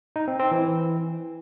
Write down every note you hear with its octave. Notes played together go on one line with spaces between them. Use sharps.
D#4
C4
C4
E3